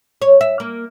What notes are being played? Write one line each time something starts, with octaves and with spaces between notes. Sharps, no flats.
C#5
E5
A#3